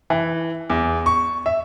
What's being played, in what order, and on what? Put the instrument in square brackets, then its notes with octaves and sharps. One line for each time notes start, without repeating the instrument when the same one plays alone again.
[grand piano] E3
E2
C#6
E5